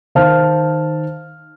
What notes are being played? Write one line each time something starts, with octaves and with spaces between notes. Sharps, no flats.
D#3 C5 F5 A5 F6